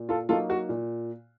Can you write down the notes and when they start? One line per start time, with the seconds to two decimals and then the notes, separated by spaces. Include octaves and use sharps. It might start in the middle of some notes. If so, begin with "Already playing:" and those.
Already playing: A#2
0.09 F4 A4
0.29 F#3 A#3 D#4 F4 A4
0.50 F#4
0.69 A#2